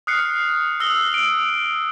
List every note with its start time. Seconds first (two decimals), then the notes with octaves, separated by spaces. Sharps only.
0.07 D#6 F6 F#6 C7 C#7
0.80 D#6 E6 A#6 G7
1.14 D7